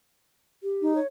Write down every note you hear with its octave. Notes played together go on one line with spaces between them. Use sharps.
G4
D#4
C#5